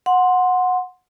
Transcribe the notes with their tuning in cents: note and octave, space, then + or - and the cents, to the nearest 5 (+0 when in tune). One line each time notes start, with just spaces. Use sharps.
F#5 -15 C6 +0